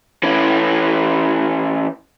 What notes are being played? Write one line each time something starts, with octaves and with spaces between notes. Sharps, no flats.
E3 C#4